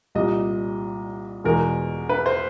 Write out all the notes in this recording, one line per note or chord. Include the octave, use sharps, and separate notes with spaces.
C2 A#2 G3 D#5
E2 B2 G#3 A#4
B4
C5